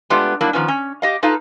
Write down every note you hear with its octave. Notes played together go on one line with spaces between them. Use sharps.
G#3 A3 B3 D4 F4 G4
F#3 G3 A#3 D4 E4
D#3 F3 B3 C#4
C#4
G4 D#5 F5
D#4 F4 A4 B4 F5